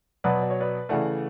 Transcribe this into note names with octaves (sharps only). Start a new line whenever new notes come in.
B2 F#3 B3 B4 D5
D5
C#5
B4 D5
C#3 E3 A3 D5 F#5